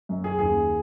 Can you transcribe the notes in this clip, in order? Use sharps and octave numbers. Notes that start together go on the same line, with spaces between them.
F#2
G#4
D#2 G#4